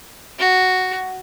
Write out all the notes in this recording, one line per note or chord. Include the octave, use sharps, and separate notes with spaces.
F#4